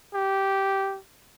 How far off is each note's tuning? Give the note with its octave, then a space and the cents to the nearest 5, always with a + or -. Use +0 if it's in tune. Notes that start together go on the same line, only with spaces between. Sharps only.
G4 -10